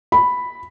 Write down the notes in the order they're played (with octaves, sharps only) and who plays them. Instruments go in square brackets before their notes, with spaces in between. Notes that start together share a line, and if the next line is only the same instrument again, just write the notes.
[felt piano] B5